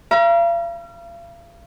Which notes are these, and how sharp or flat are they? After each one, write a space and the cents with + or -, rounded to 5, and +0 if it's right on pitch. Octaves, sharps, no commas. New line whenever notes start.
F5 -40 A#5 +35